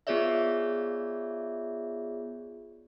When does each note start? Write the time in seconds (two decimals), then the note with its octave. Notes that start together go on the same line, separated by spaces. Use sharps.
0.07 B3 F4 G#4 C#5 D5 E5